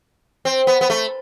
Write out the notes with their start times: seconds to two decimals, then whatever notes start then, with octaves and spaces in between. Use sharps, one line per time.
0.45 C4
0.67 B3
0.81 B3
0.90 A3